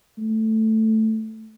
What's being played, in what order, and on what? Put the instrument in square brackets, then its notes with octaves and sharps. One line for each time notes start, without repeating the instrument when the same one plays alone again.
[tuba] A3